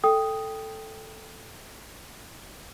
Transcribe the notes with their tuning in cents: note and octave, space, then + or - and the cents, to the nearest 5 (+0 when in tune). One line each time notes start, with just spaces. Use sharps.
A4 +0 G5 +5 D#6 +0